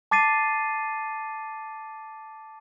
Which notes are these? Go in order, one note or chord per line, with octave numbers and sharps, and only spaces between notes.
A5 D6 A6 C7 D#7